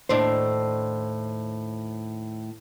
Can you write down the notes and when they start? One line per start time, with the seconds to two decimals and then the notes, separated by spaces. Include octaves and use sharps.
0.09 D#2 A2 D4 C5